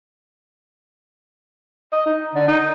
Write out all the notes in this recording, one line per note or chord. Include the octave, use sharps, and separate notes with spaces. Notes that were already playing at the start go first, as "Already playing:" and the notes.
D#5
D#4
D3
D#4